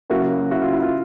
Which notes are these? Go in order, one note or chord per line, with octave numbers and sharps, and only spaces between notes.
C#3 F#3 A#3 E4 F#4
E4 F#4
F4
E4
F4